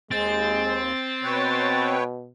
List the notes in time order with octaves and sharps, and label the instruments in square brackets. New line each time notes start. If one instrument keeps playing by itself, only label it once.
[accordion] D#2 [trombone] G#3 [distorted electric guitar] C4 [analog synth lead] A6
[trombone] B2 [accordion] B4 C#5 G5